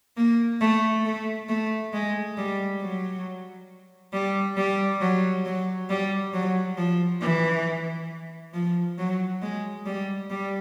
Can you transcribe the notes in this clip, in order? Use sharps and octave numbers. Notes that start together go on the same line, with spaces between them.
A#3
A3
A3
A3
G#3
G3
F#3
G3
G3
F#3
F#3
G3
F#3
F3
E3
F3
F#3
G#3
G3
G3